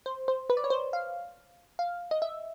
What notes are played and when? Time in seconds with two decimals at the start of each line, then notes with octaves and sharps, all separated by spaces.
0.06 C5
0.28 C5
0.50 B4
0.57 D5
0.64 C#5
0.70 C5
0.93 F5
1.79 F5
2.11 D#5
2.22 E5